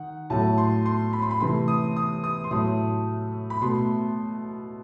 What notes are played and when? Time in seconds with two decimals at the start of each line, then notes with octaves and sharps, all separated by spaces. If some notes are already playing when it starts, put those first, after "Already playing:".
Already playing: D#3 F#5
0.30 A2 F#3 A3 A5
0.58 C6
0.86 C6
1.13 B5
1.22 C6
1.31 B5
1.40 C3 E3 A3 C6
1.68 D#6
1.96 D#6
2.24 D#6
2.44 C6
2.51 A2 F#3 A3 D#6
3.50 B5
3.62 B2 A3 C6